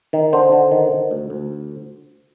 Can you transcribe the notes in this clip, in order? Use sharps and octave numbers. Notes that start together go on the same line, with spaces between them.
D#3
D3 C5
D3
D#3
D#3
D2
D2